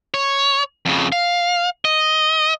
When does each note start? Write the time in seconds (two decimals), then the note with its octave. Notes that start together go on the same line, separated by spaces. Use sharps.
0.14 C#5
0.86 F2 C#3
1.12 F5
1.85 D#5